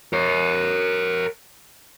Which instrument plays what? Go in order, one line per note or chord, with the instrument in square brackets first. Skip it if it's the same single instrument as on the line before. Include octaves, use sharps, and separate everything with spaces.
[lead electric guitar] A#4 C#5